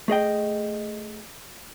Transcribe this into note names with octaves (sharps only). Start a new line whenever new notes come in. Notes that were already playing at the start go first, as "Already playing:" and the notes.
A3 G#4 D#5 G5